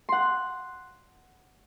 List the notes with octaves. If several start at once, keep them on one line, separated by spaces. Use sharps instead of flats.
F#5 C6